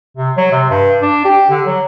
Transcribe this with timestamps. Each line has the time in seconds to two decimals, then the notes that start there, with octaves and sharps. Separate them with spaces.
0.17 C3
0.37 F#3
0.52 C3
0.70 G2
1.02 D4
1.25 G4
1.50 D3
1.66 F#3